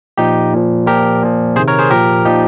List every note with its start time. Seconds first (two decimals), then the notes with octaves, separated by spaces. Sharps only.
0.18 A#2 F3 D#4 G4
0.53 A#2 F3
0.87 A#2 F3 G4 A#4
1.22 A#2 F3
1.56 C3 G#4 C5
1.59 D#3
1.68 A#4 C#5
1.79 G#4 C5
1.90 A#2 F3 G4 A#4
2.25 A#2 F3 D#4 G4